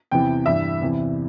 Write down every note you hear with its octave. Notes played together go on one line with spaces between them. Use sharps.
E2 C3 E3 G5
G2 E3 E5
E2 C3 E3